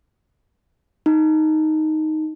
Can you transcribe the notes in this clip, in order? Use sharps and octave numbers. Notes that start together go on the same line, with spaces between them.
D#4